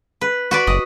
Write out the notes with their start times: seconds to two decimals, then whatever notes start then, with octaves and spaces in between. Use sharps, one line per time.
0.21 B4
0.51 F#4 B4 D5
0.67 F#1 D#5